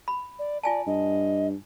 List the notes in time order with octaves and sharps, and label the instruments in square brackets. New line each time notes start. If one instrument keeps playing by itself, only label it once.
[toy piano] B5
[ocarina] D5
[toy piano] F4 G#5 A5 [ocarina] D5
[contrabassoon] G2 [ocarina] D#5